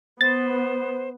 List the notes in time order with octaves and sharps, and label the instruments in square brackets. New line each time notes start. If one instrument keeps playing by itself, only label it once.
[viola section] B3 [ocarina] C5 [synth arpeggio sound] A6